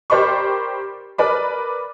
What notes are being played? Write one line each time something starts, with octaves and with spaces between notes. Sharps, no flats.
G4 A#4 C5 D5 B5 C#6
A#4 B4 D5 B5